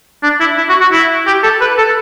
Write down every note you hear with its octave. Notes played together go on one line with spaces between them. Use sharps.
D4
E4
E4
F#4
F#4
E4
G4
A4
B4
A4